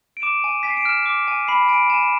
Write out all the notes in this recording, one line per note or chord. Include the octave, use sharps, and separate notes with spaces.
D7
D6 E7
G#5
G#5 B6
C7
D7
F6 E7
D6
G#5
B5 C7
G#5 D7
G#5 E7